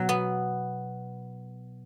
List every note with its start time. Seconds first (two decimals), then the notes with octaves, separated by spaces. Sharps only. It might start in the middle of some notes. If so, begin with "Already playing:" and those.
Already playing: B2 F#3
0.09 B3